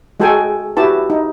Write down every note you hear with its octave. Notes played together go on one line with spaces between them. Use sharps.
G#3 F#4 G#4 A4 G5 G#5
E4 F#4 G4 B4 A5
D#4